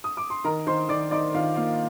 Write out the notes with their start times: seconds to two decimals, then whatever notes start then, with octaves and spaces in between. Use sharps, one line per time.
0.04 D#6
0.17 D6
0.30 C6
0.44 D#3 A#4 A#5
0.67 D#3 C5 C6
0.89 D#3 D5 D6
1.11 D#4 D5 D6
1.34 D#3 F4 F5
1.56 A#3 F4 F5